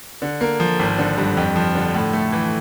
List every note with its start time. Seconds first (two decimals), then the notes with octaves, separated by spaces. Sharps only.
0.22 D3
0.41 A#3
0.60 F3
0.79 G#1
0.98 D3
1.18 G2
1.37 F2
1.56 F3
1.75 D3
1.94 A2
2.13 A3
2.32 E3